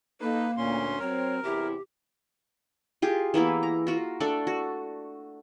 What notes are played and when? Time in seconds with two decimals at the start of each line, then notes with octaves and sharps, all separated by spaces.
0.21 A#3 D#4 A4 B4
0.57 D2 A#2 C#4 C6
0.99 F#3 C4 A#4 C#5
1.43 E2 C3 E4 G4
3.02 F4 G4 G#4
3.34 E3 A#3 B3 E4
3.63 A#5
3.87 F4 F#4 A#4
4.20 A3 D4 A4 D5
4.47 F#4